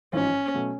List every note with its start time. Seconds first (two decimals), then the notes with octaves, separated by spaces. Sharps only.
0.13 A1 G#2 F3 C#4
0.55 B2 F#3 A3